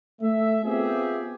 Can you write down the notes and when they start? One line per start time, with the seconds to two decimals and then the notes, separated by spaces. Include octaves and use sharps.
0.22 A3 E5
0.63 B3 C4 F4 G4 G#4 E5